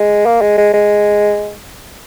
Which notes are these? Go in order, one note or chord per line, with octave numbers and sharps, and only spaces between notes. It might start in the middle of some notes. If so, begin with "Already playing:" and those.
Already playing: G#3
A#3
G#3
G#3
G#3